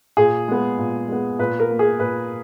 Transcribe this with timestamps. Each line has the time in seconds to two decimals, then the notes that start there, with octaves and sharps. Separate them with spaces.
0.17 A#2 G#4
0.48 G#3 B3
0.79 A#2
1.08 G#3 B3
1.39 A#2 B4
1.60 A#4
1.70 A#3
1.79 G#4
2.00 A#2 B4